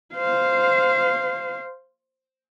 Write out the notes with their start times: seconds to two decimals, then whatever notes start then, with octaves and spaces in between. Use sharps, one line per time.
0.15 C5 F5